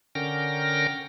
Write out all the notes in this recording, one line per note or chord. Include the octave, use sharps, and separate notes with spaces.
D3 C#4 A#4 G5 F6 A#6